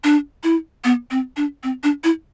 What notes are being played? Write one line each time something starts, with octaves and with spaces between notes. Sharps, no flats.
D4
E4
B3
C4
D4
C4
D4
E4